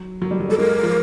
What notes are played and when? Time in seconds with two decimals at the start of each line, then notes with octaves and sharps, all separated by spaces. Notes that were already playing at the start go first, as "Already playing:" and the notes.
Already playing: F#3
0.22 F#3
0.31 G3
0.40 F#3
0.49 G3 A4
0.58 G#3 A#4
0.83 F3